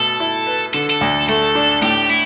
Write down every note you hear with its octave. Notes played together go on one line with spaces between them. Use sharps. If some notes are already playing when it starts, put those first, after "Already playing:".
Already playing: B2 A3 A4
E4
B4
D3 A4
A4
D2
A3 A4
D4
A2 G4
E4